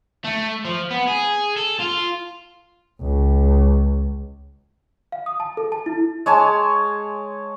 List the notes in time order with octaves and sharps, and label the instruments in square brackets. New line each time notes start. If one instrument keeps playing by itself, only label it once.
[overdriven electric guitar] A3
F3
B3
G#4
A4
F4
[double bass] C#2
[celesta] F5
D#6
A5
A4
A5
E4
[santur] G#3 C#5 G#5 A5